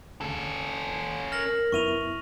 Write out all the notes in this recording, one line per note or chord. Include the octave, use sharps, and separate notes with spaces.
D2 C#3 C#4 A4
A#4 F6 A#6 F#7
F#2 B3 E4 C#6 D#7 F7